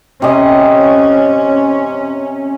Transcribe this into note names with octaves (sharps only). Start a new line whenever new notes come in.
C3 C#4 D#5